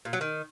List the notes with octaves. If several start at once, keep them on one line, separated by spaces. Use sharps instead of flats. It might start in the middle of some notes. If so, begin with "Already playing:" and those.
A#2
F#3
D#3